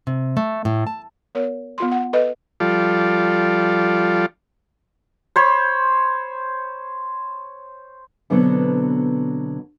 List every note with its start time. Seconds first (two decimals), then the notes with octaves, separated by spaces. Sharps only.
0.07 C3
0.37 A3
0.65 A2
0.87 A5
1.35 B3 A#4 C#5
1.78 B3 F4 C6
1.92 F#5
2.13 A4 B4 D#5
2.60 F3 G3 F4 A4 D5
5.36 C5 C#5 B5
8.30 B2 D3 F#3 B3 C4